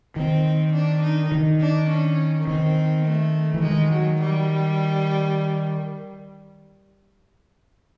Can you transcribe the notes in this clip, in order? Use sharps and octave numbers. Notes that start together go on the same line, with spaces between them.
D#3 C4
D4
D#4
D#3
D4
C#4
D#3 C4
A3
E3
D#3 G#3
F#3
G3